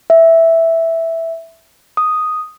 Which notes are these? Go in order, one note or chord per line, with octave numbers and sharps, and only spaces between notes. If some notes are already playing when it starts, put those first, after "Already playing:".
E5
D#6